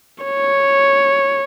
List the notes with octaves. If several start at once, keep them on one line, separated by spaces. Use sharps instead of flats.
C#5